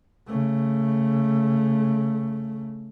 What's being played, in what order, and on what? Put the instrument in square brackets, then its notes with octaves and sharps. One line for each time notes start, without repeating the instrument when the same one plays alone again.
[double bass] C#3 A3